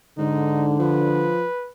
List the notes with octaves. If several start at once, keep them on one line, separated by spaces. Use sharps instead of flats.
G#2 D3 D#4
F3 B4